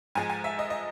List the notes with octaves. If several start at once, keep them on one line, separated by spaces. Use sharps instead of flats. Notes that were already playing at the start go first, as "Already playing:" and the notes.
G#2 F3 G#3 G#5
G#5
E5
D#5
D#5